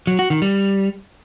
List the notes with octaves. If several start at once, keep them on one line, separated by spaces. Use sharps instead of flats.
F#3
F#4
D#3
G3